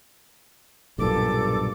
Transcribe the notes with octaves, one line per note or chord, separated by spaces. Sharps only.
B1 G2 A#2 A4 D6